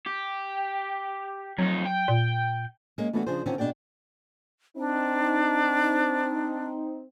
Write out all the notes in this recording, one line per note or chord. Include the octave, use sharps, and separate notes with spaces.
G4
F2 F#3 D#4
G5
A#2
G#3 A#3 C#4
E3 A3 B3 D4 F4 F#4
C#3 F3 D4 G#4 C5
D3 D#3 C4 C#4 F4
B2 D4 G#4 D5 G5
C4 D4 D#4